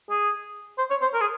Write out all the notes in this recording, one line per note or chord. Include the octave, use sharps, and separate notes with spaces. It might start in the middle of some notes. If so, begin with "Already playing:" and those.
G#4
C5
C#5
C5
A#4
G#4